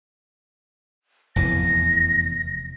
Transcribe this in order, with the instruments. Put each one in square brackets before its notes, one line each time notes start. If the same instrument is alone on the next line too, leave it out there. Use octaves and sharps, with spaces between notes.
[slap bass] F1 E2 E3 [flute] A#6